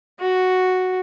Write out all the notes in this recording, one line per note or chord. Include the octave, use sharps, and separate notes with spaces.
F#4